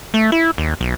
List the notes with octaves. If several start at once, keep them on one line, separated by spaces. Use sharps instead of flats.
A3
E4
D#2
B1